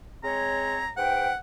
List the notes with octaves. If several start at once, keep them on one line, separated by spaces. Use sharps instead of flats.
G#3 C4 C#5 A#5
G#2 B4 F#5 G5